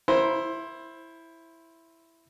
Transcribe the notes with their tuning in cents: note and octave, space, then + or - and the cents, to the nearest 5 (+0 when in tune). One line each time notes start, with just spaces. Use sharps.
E4 +5 C5 +20 A#5 +20